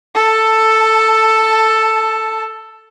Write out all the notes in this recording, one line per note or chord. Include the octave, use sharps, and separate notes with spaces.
A4 A5